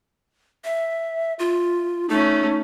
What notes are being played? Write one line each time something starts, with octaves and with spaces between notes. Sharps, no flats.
E5
F4
A3 C#4 D#4